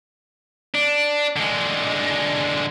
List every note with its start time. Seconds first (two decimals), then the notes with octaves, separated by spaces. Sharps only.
0.74 D4
1.36 D3 G#3